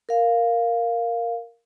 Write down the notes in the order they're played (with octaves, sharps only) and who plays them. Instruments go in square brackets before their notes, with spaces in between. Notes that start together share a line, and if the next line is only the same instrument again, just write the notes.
[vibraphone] A#4 F5